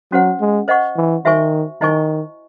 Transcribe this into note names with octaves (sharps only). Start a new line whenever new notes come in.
F#3 C#4 F#4 C5 F#5
G#3
C5 D#5 F#5 C#6
E3
D#3 F#4 C5 E5 G#5 C#6
D#3 E4 C5 D#5 G#5 C#6